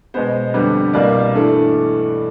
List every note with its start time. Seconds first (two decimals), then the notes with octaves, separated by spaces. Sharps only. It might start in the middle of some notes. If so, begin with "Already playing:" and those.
0.14 B2 G#3 B3 C5
0.54 F2 D3 G3 B3
0.93 C2 B2 G3 A#3 D5
1.33 G2 E3 A3